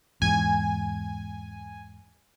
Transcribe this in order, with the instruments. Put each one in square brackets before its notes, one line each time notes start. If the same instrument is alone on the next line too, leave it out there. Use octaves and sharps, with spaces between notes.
[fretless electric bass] E2 G#2 [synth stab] G#5